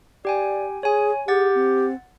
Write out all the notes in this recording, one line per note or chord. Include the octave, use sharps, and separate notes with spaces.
G4 D5 G5 G#5
G#4 C#5 G#5
G4 G#4 F#5 A6
C4